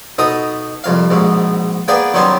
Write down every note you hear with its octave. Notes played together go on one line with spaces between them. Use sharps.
B2 D#4 A4 D#5 D#6
C2 F2 F5
A#1 G#2 B2
A#3 B3 G#4 B4 D5 G5
D#3 F#3 G3 B3 C#4 C5